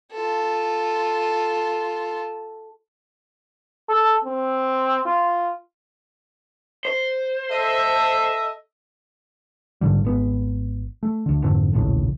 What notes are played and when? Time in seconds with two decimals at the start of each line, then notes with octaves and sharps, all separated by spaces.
0.12 F4 A4
3.89 A4
4.25 C4
5.06 F4
6.85 C5
7.51 A4 D#5 E5
9.81 A1 G#2 D3 G3
10.05 G#1 B3
11.03 A3
11.26 D2 D3
11.43 F2 G#2 D3 C4
11.73 A#1 D#2 A2 C#3